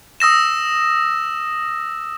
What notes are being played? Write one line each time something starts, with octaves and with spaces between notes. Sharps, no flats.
D#6 E6 A#6 E7